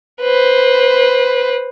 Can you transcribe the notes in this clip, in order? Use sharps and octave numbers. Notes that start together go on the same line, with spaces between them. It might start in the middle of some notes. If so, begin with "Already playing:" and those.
B4 C5